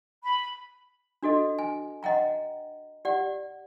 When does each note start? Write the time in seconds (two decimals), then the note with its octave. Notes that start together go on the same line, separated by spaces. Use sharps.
0.23 B5
1.23 D4 F#4 A4 D#5
1.59 G#5
2.03 D#5 F#5 G5 A#5
3.05 G4 D5 F#5